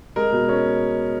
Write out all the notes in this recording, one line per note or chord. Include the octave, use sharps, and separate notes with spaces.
G#3 A#4
B2
C#4